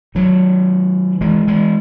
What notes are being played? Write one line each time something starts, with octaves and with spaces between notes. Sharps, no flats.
D#3 F#3
E3 G#3
E3 G#3